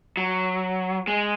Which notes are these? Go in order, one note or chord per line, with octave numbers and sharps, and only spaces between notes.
F#3
G#3